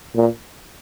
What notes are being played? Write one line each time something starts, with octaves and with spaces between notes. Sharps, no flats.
A#2